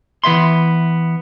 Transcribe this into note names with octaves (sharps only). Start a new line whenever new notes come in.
E3 B3 E5 C6